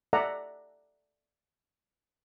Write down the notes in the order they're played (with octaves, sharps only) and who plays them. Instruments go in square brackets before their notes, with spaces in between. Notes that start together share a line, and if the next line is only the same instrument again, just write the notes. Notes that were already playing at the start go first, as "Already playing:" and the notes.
[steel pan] A4 D5 E5 F#5 A#5